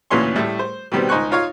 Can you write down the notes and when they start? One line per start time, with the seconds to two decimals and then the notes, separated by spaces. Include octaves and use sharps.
0.10 D2 A#2 E3 C#4 C6 C#6
0.36 A2 G3 A3
0.59 C5
0.92 B2 D#3 G3 B3 C4
1.09 C#2 D#4 C5 G#5 C#6 F#6
1.31 D#4 F4 C#5 F5